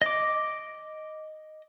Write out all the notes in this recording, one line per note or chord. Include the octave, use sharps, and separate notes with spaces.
D#5 D6